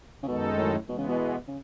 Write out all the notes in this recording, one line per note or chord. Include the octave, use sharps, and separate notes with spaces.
C#3
F#2 B2 D#3 G#3 D#4 A4
A2
B2 E3 G#3 B3
C#3
B2
C#3